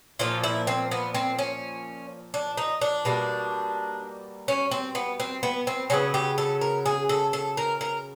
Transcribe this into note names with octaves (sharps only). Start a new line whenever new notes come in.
A#2 F3 A#3 F4
E4
C4
B3
C4
C#4
D4
D#4
D4
B2 G3 A#3
C#4
C4
B3
C4
B3
C4
C#3 F#3 B3 C#4
G4
A4
A#4
G#4
A4
A4
A#4
A#4